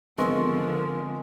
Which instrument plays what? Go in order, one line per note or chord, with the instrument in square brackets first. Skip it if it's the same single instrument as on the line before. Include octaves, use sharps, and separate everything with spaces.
[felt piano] G#1 B3 [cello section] D3 F3 [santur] G#3 C#6 E6 [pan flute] A#4